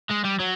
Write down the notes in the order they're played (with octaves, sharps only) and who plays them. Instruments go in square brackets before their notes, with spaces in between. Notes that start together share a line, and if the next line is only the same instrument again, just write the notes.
[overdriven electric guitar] G#3
G3
F#3